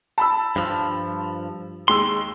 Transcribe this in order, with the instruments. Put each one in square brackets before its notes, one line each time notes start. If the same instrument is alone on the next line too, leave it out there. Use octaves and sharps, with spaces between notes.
[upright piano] A5 B5 E6
[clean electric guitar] G2 F3
[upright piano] D#2 G#3 E6 [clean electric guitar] C6